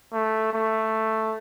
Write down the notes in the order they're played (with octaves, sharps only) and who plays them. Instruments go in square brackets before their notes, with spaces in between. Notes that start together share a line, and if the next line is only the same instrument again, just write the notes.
[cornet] A3
A3